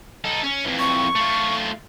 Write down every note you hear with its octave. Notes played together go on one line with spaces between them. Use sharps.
D#4 A4
C#4
F2 E3
C#6
A3 F4